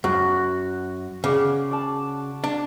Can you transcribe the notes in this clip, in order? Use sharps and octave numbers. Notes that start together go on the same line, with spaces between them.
F#2 F#4
C#3 D5 F#5
D5 A5
D4